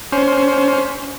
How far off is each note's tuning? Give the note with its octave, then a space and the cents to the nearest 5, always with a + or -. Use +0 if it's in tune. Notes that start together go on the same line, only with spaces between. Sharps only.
C#4 +25 C5 +10